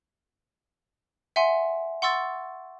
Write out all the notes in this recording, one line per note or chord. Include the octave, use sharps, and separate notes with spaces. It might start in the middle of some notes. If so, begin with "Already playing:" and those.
E5 F#5 G#5 C6
F#5 C6 C#6 E6 A6